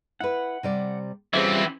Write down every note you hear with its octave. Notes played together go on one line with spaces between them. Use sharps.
E4 B4 F#5
C3 G3 D5
E3 G3 C4 C#4 F4 G#4 C5 E5